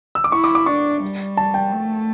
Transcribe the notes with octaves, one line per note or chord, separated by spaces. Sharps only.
E6
D6
E4 C#6
D6
D6
D4 C#6
G3
A5
G5
A3